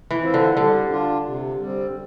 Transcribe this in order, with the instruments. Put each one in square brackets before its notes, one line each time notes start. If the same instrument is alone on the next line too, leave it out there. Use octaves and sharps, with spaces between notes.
[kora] E3
[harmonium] C4 F4 C5 E5
[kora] D3
[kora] D3 [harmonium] G3
[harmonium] D4 F4
C3
G3 C4